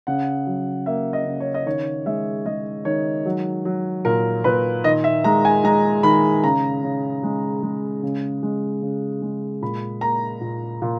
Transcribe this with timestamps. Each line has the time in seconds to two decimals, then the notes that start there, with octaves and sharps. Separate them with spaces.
0.07 C#3 F#5
0.47 F#3
0.86 A#3 E5
1.13 D#5
1.26 C#3
1.40 C#5
1.54 D#5
1.66 D#3 C#5
2.06 G#3 E5
2.46 G#3 D#5
2.85 D#3 C#5
3.26 F#3
3.65 F#3
4.05 A#2 A#4
4.44 A#2 B4
4.84 D#3 D#5
5.04 E5
5.24 G#3 A#5
5.45 G#5
5.64 G#3 A#5
6.03 D#3 B5
6.44 C#3 A#5
6.84 C#3
7.23 G#3
7.63 G#3
8.03 C#3
8.43 G#3
8.82 C#3
9.22 G#3
9.62 A#2 B5
10.01 A#3 A#5
10.41 A#2
10.82 A#2